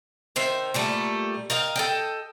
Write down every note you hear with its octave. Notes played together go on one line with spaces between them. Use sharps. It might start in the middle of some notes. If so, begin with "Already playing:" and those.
D#3 C5 E5
A#2 G3 A3
A#4 D#5 F5 G5
A4 D#5 G5